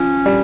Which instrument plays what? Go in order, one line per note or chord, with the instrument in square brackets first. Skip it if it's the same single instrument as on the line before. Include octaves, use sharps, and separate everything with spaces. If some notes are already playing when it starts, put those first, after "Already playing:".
Already playing: [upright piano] F3 [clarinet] C#4
[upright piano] G3